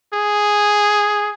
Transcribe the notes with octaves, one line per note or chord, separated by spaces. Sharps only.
G#4